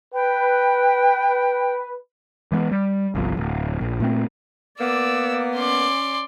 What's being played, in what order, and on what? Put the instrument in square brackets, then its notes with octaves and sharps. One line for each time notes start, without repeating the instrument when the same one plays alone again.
[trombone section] B4 [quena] G5
[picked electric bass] E3 G#3 A3 B3
G3
G1 C2 F3
D1
A#1
A#2 A3 C4
[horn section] A#3 B3 [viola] D5 [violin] E6
[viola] C#4 [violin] D5 C6